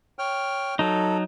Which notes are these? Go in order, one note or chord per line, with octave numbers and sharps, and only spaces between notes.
C#5 G5 F6
F#3 D#4 A4